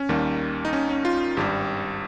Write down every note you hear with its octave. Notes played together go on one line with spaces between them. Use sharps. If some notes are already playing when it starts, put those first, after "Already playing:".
Already playing: C#4
D#2 D#3 G3 A#3
D#4
C#4
C#4
F4
G#1 G2 G3 G4